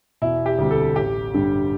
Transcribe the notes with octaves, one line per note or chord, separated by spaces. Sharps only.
E1 E4
G4
D2 C3 G3
A4
A1 G4
G2 D3 G3